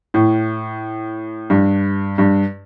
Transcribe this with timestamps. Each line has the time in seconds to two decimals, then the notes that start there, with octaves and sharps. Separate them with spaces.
0.14 A2
1.50 G2
2.18 G2